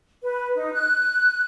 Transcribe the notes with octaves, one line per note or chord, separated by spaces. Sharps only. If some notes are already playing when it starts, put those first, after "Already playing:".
B4
D#4
F#6